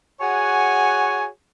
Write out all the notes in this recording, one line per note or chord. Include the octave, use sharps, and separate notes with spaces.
F#4 G#4 C#5 F#5 G#5